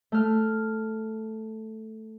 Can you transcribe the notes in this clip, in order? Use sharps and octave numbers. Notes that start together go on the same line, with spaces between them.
A3 F6